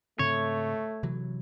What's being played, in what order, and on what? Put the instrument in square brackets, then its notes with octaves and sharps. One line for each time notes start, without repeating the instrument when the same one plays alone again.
[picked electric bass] G#2 C#3 C4 [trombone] A3 [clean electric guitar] C#5
[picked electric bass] C3 E3 F#3